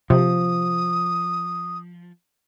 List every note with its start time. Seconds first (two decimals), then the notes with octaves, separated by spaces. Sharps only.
0.10 C3 F3 D#6